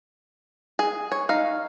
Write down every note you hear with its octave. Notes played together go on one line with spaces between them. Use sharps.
G#4
C#5
D#4 F5